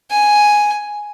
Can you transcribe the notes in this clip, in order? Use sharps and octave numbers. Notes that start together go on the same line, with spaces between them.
G#5